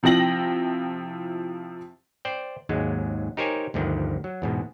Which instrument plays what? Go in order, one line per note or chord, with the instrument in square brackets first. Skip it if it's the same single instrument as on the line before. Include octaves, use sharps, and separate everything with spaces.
[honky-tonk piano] C3 F3 E4 G5 A#6 F#7
[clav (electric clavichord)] C5 D5 G5
D#2 G#2 F#3 G#3
D#4 G4 A#4 C5 C#5 G#5
D2 G2 D3 D#3 F3
F#3
E2 G#2 B2